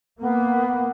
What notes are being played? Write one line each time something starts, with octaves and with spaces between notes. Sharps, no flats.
A#3 B3